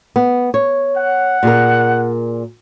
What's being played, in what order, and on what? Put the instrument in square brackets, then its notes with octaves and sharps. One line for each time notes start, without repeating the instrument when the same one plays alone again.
[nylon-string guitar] B3
C#5
[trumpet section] F#5
[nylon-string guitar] A#2 G#4 A#4